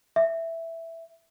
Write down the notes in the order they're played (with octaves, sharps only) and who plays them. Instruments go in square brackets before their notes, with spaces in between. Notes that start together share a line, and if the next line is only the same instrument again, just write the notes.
[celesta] E5